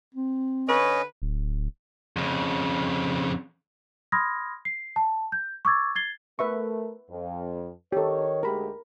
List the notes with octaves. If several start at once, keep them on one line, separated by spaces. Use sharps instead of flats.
C4
D3 C#4 B4 C#5 D#5
D1
F2 C#3
B5 C6 D#6 F6 G#6 A#6
C7
A5
G6
C#6 D6 E6 G#6 A6
G#6 A6 C7 G7
A3 A#4 B4 E5 C#6
F2
D#3 G4 A4 C#5
D2 G#3 G4 A#4 B5